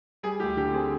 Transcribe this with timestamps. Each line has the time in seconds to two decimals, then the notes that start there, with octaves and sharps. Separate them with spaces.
0.23 G3 G#4
0.40 D2 G4
0.57 D3 G4
0.73 C4 G#4